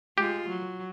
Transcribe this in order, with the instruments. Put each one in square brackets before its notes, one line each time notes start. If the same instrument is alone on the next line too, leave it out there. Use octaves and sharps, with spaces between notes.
[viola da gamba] G#3 F4 [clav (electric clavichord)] G4
[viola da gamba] F#3